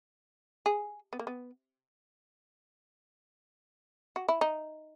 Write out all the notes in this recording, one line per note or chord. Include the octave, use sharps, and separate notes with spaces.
G#4
B3
A#3
B3
F#4
E4
D#4